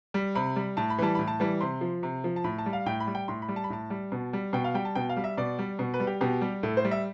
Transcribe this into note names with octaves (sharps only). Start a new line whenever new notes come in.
G3
C3 B5
G3
A2 A5
B5
E3 G3 A5
A2 B5
A5
E3 G3
C3 C6
F3
C3
F3
A5
A2 B5
A5
G3
F5
A2 G5
B5
G3
G5
A2 C6
B5
G3
A5
B5
A2 A5
G3
B2
G3
B2 G5
F5
G3 G5
A5
B2 G5
F5
G3
E5
B2 D5
G3
B2
B4
G3
G4
B2 G4
G3
A2 A4
C5
G3
E5